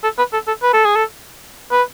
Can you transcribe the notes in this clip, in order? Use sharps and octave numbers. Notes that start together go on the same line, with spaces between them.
A4
B4
A4
A4
B4
A4
G#4
A4
B4